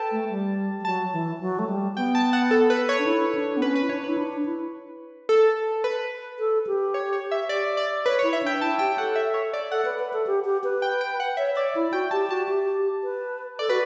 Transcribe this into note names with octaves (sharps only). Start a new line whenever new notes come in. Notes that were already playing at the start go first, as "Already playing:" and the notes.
Already playing: A4 B4 G5 A5
A3
G3
G3
F#3 A5
E3
F#3
A3
G3
B3 G5
A5
F#5
A4
B4
C#5
D4
E4
D4
B3
C#4 B4
B4
E4
D4 C#5
E4 B4
D4
E4
A4
B4
A4
G4
C#5
C#5
E5
D5
D5
B4 C#5
E4 C#5
E5
D4 G5
E4 A5
G4 G5
A4 F#5
E5
C#5
D5
A4 F#5
B4
B4
A4
G4
G4
B4
G5
G5
F#5
C#5 E5
C#5 D5
E4
F#4 G5
G4 A5
F#4 A5
G4
B4
A4 D5
F#4 B4